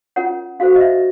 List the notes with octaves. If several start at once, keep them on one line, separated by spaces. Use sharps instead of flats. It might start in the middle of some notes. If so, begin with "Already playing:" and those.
C#4 F4 A#4 C#5 F#5
C#4 F#4 A4 C5 F5
D#5
E5